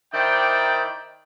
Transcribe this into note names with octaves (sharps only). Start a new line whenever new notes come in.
D#3 D#4 E4 C5 D5 G5